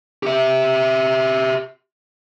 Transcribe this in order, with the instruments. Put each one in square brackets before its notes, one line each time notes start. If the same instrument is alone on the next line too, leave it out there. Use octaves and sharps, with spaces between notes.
[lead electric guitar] G4 E5